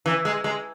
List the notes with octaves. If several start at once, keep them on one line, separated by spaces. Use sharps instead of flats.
E3
G#3
G#3